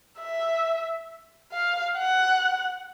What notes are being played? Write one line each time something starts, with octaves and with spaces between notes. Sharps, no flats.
E5
F5
F#5